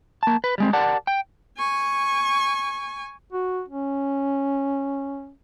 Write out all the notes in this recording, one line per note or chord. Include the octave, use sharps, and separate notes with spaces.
A#3 A5
B4
G3 G#3 C4
G4 A#4 D5 F#5 A5
G5
G#5 C#6
F#4
C#4